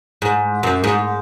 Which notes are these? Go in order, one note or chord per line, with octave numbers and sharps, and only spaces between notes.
G#2
F#2
G#2